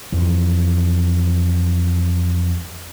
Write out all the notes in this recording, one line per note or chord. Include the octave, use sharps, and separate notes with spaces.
F2 E3